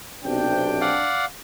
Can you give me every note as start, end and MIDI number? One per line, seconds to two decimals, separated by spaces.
0.24 0.97 35
0.24 0.97 48
0.24 1.12 62
0.24 0.97 79
0.81 1.25 74
0.81 1.25 77
0.81 1.25 78